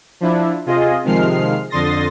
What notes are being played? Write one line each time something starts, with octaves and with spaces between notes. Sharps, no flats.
F3 D4 E4
C3 F4 G#4 D#5
C3 D#3 F3 G#3 F6 C7
F2 D3 C6 D#6 A6 A#6